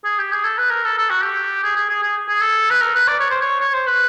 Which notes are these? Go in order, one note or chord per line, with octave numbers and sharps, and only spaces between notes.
G#4
G4
G#4
A4
B4
A#4
A4
A4
F#4
G4
G#4
G#4
G#4
G#4
G#4
A4
B4
A#4
B4
D5
C#5
C5
C#5
C#5
C5
B4